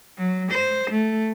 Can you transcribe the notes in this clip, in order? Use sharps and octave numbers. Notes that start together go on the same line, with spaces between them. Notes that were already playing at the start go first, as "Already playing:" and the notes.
F#3
C5
A3